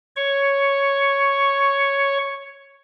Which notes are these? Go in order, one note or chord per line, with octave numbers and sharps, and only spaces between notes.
C#5 C#6